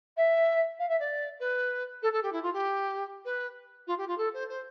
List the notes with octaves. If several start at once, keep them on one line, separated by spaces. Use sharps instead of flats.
E5
F5
E5
D5
B4
A4
A4
G4
E4
F4
G4
B4
F4
G4
F4
A4
C5
C5